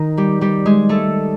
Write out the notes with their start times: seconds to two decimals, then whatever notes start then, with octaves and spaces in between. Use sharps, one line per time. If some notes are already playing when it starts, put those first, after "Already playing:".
Already playing: D#3 D#4
0.17 G3 G4
0.41 G3 G4
0.66 G#3 G#4
0.89 A3 A4